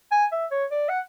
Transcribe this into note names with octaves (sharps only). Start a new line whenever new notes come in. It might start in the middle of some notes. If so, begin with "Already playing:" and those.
G#5
E5
C#5
D5
F#5